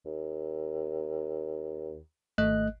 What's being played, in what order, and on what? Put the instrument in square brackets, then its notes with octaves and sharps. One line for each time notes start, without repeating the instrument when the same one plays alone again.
[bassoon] D#2
[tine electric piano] G#1 D#5 F#6 [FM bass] A3